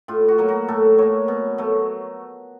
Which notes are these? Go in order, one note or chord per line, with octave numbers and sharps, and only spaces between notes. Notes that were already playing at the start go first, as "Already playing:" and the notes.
A2 F4
F#4
F#3 A#3
F#4
A2 A4
F#3 A#3 C#5
B2
F#3 A3